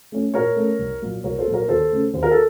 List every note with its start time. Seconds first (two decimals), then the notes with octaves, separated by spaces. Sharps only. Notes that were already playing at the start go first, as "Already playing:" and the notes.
0.12 A3 C#4
0.34 A#2 A#4 C#5
0.56 A3 C#4
0.79 C2
1.02 A#2 F#3 A#3
1.24 C2 A#4 C#5
1.38 A4 C5
1.47 A#2 F#3 A#3
1.53 A#4 C#5
1.68 D#2 A4 C5
1.91 C#3 A3 C#4
2.13 D#2 C5
2.23 A#4
2.31 A4